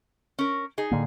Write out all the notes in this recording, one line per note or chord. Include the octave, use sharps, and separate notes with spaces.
C#4 A#4
D#4 G#4
A2 D3 A#3